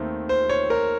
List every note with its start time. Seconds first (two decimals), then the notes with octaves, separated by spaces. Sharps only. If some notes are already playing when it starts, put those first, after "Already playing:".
Already playing: D#2 D#3 A3 C4
0.29 C5
0.49 C#5
0.70 A#4